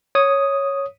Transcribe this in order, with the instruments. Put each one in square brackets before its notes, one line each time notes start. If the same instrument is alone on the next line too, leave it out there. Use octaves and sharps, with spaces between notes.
[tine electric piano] C#5 D#6